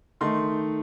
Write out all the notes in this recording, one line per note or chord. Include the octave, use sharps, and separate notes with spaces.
D#3 A3 D#4 C6